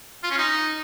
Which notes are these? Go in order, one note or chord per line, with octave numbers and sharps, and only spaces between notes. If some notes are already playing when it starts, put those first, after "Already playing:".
F4
C#4
D#4